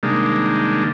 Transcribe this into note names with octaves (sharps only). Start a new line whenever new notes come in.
C3 D#3 G3 G#3 A#3 D4